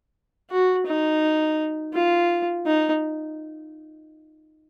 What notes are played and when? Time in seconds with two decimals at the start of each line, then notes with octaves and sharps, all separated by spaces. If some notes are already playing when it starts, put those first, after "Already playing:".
0.51 F#4
0.87 D#4
1.94 F4
2.66 D#4